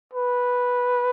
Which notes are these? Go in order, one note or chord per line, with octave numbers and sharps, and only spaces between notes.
B4